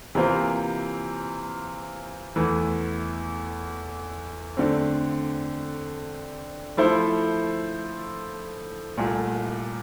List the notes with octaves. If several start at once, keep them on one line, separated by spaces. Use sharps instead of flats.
C3 E3 A#3 F4 C5
E2 E3 A3
D3 A3 C4
F3 A3 E4 A4 C5
C2 A#2 A3